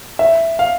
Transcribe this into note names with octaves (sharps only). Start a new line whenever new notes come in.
E5
F5